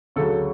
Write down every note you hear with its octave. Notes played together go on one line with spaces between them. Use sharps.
D2 C#3 F#3 A4